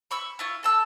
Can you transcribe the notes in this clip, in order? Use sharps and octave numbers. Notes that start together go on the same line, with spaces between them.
B5 C#6 E6
E4 F4 C#6
A4 A5 E6